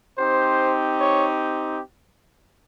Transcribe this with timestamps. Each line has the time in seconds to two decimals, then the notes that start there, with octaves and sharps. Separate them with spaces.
0.18 C4 D#4 G4 C5
1.00 C#5